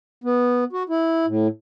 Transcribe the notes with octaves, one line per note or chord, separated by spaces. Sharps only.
B3
F#4
E4
A2